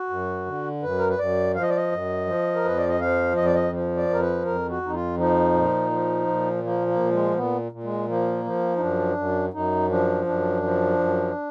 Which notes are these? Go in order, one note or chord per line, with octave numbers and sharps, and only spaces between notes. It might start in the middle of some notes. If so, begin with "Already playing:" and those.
Already playing: F#4
F#2
D3
F#2 B4
A#4
B4
F#2 D5
F3 F5
D#5
D5
D#5
F#2
F3
A#4
F2 B4
D5
D#5
F3 F5
F2 D#5
D5
D#5
F3
D5
F2 A#4
B4
F2 A#4
F#4
F2 D#4
F4
F3 D#4
A#2
F3
A#2
F3 A#3
A#3
A#2
G#3
A#3
A#2 B3
A#2
G#3
F3 A#3
F3
D#4
F#2 D4
F#2
F#2 D#4
F3 D4
F#2 D4
F3
F#2